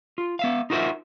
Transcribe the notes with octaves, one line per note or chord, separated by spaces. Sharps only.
F4
B3 E5 F5
D#4 F4 F#4 A#4 C5 E5